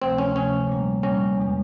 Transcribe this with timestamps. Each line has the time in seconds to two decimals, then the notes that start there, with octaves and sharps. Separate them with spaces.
0.02 D2 C3 F3 A3 C4
0.18 C#4
0.35 D2 C3 F3 A3 C#4
0.69 A#2 G3 A#3
1.03 A#2 G3 A#3 C#4
1.38 E2 B2 G#3